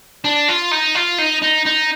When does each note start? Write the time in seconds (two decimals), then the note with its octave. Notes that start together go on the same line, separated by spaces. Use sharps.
0.24 D4
0.48 F4
0.71 D#4
0.95 F4
1.18 D#4
1.42 D#4
1.65 D#4